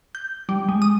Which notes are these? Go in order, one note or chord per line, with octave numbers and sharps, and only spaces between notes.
G6
G3
G#3
D#6